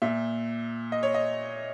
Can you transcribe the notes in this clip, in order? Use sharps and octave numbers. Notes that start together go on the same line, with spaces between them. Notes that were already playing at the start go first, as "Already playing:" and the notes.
A#2 E5
D#5
C#5
D#5